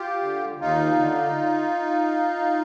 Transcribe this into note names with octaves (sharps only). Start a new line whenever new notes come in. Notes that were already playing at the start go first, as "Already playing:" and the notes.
Already playing: F4 G4
D3
D#2 D#4 F4
D3